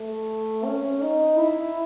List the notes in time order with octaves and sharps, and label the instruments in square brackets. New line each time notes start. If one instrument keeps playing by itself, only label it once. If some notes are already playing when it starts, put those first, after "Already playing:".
Already playing: [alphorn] A3
C#4
D#4
E4